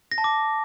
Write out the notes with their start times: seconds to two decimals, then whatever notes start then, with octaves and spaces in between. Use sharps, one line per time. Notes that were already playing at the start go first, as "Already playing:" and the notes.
0.11 A#6
0.18 A5
0.24 D6